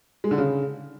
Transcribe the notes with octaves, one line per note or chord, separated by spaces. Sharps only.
G#3
D3
C#3